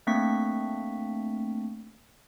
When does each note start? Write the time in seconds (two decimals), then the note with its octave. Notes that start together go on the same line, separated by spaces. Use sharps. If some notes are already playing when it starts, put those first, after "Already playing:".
0.07 A3 A#3 C4 D4 C#6 B6